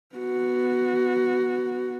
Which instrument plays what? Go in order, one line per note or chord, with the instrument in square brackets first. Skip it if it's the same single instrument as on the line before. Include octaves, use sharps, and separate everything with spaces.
[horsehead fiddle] B3 F#4